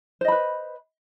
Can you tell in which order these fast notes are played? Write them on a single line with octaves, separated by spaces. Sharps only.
C5 D#5 B5 B4